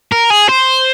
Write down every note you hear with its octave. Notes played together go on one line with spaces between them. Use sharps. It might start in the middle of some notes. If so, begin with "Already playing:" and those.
A#4
G#4
C5